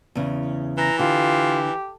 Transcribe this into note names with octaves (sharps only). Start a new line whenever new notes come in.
E2 C#3
E3 A#5
D3 F4 G4